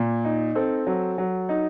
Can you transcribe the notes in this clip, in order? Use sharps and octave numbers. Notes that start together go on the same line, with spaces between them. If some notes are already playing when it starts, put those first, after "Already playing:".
Already playing: A#2
D#4
C4 A4
F#3
F#3
D#4